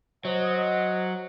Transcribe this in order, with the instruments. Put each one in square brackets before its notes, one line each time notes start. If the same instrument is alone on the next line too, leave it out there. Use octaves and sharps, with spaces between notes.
[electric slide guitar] F#3 [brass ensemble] C5 D#5 F#5